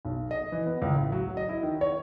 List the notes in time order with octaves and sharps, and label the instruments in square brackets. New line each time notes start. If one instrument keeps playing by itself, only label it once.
[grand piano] B1
D#5
E3
B3
C#2
A1
F#3
D#5
E4
D#3
C#5